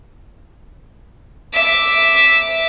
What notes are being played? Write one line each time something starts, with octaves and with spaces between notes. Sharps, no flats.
E5 D6